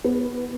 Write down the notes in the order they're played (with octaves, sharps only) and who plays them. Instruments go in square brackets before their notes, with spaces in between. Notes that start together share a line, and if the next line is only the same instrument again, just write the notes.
[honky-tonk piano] B3